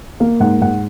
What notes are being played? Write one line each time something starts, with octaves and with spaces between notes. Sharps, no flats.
A#3 F5
G#2 F#5
G#2 F#5